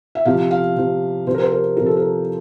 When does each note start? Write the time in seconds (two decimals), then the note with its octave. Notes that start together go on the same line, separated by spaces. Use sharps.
0.15 E5
0.25 C3 F3 F5
0.51 F5
0.77 C3 F3
1.27 C3 C5
1.30 F3 A#4
1.42 C5
1.52 A#4
1.77 C3 F3 A#4
1.86 A4
1.97 A#4